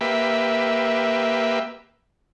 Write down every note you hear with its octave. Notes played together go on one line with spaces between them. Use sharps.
A#3 G4 B4 E5